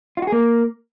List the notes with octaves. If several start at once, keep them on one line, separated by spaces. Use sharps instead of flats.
F4
F#4
G#4
A#3